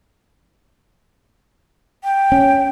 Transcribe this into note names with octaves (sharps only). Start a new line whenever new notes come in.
G5
C#4